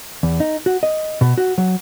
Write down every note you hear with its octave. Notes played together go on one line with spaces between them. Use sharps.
E2
D#4
F#4
D#5
B2
F#4
F#3